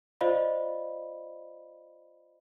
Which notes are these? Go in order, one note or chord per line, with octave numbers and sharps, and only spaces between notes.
F4 C5 D5 D#5 F5 B5